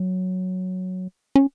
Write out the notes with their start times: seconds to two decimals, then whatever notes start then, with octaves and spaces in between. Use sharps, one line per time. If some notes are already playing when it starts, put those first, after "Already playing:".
Already playing: F#3
1.36 C#4